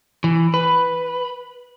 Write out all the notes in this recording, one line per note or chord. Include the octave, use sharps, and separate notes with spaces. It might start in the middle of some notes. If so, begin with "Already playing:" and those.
E3
B4